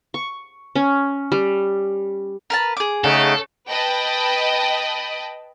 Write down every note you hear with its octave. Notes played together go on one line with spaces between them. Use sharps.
C#6
C#4
G3
A#4 B4 A5
G#4 D6
C#3 A3 D#4 A4 F#5
B4 D#5 G5 A5 B5